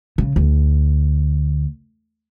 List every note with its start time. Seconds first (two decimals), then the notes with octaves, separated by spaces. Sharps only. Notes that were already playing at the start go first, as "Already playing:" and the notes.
0.18 C#3
0.36 D2